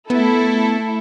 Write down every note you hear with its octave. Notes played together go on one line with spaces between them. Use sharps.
A3 B3 E4 A4